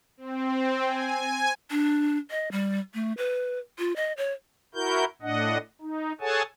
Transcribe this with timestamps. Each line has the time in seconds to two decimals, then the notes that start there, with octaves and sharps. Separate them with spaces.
0.17 C4
0.84 G#5
1.71 D4
2.30 D#5
2.52 G3
2.94 A3
3.18 B4
3.79 F4
3.96 D#5
4.17 C#5
4.75 E4 F#4 A#4 G6
5.22 A2 D4 D#5 F#5
5.81 D#4
6.20 G#4 A4 C#5 F#5 G#5 A5